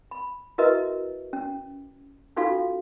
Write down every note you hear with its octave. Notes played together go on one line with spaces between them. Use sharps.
B5
E4 F#4 A#4 B4 D#5 E5
C#4
C#4 D#4 F4 F#4 A4 F5